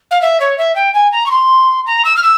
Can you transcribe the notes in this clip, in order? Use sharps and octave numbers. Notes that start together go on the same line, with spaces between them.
F5
E5
C#5
E5
G5
G#5
A#5
C#6
C6
A#5
E6
F6
E6